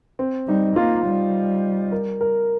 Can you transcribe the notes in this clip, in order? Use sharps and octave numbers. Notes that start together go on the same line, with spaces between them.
C4
G3 D#4
A#3 F4
G3
A#4
A#4